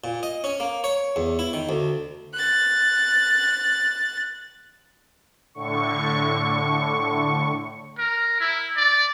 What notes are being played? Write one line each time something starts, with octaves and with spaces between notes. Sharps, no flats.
A#2
D#5
C#4
A#3
C#5
E2
E4
D#3
D2
F#6 A6
A2 D3 C#6
A#4
E4
D5